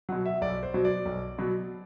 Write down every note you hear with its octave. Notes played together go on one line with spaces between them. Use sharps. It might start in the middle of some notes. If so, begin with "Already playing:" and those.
B2 F#3 F#5
E5
B1 D5
C5
B2 F#3
D5
B1
B2 F#3